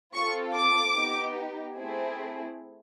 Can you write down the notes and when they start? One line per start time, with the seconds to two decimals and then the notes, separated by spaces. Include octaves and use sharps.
0.14 C4 F4 A4 C#6
0.56 D6
0.96 B3 D#4 G4
1.77 A3 C4 E4 G#4